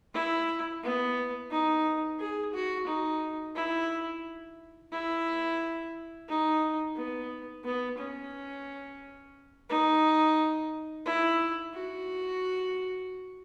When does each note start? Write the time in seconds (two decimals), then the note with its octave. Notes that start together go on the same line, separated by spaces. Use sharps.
0.14 E4
0.83 B3
1.51 D#4
2.19 G#4
2.54 F#4
2.87 D#4
3.56 E4
4.92 E4
6.28 D#4
6.96 B3
7.64 B3
7.98 C#4
9.69 D#4
11.06 E4
11.74 F#4